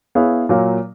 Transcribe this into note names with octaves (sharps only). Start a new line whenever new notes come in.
B3 E4 G#4 C#5 F5
A#2 F#3 A#3